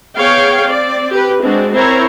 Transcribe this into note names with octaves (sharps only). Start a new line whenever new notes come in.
B3 G#4 C#5 F5 G5
C4 D5
G4 B4
G#3 C4 D4 F#4
C4 E4 A#4 C5 C#5 A#5